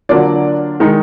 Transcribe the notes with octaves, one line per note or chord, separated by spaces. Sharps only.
D3 F#3 A#3 D4 F4 D5
D#3 G#3 D#4